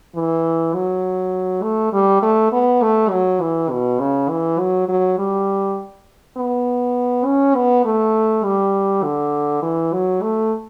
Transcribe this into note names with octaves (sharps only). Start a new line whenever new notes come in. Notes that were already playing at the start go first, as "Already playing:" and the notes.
E3
F#3
A3
G3
A3
B3
A3
F#3
E3
B2
C#3
E3
F#3
F#3
G3
B3
C#4
B3
A3
G3
D3
E3
F#3
A3